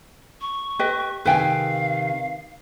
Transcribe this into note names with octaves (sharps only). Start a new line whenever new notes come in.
C#6
G4 B4 D#5
C3 D#3 A4 B4 F5 G5 G#5